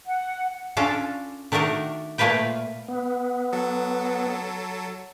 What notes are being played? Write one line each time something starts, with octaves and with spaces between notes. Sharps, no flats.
F#5
C#4 D4 F4 A4
D#3 A3 D4 F#4 A#4
A#2 A3 A#3 F4 B4 G5
B3
F#3 A4